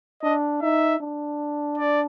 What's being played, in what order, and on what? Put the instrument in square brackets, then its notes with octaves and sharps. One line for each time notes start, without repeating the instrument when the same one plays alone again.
[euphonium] D4 [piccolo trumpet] D#5
[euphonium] D#4 [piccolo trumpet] E5
[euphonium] D4
[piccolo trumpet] D5